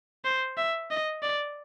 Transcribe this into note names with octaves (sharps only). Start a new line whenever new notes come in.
C5
E5
D#5
D5